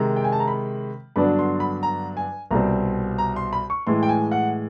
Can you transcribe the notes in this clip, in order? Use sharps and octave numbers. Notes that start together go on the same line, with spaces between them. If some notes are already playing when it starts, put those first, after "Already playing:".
Already playing: C3 D#3 G#3 A#5
G5
G#5
A5
A#5
B5
G2 D3 F#3 B3 D4 B5
C6
B5
A#5
G#5
C2 B2 G3 C4 A#5
A#5
C6
B5
C#6
A2 E3 G#3 C6
G5
G#5
F#5